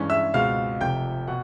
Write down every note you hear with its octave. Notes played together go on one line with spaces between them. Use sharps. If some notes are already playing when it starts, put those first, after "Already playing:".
Already playing: G2 E3 G#3 C#4
E5 E6
C#2 B2 G#3 C4 F5 F6
F1 F2 C3 G5 G6
B2 F#5